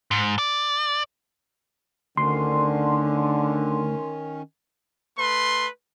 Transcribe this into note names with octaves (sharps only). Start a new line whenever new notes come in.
G#2
D5
D2 D3 D#3 C#4 C6
A3 B4 C6